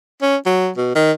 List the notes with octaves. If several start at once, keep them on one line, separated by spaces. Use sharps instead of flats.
C#4
F#3
B2
D#3